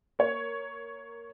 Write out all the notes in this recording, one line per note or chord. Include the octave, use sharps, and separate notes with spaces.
A#3 C#5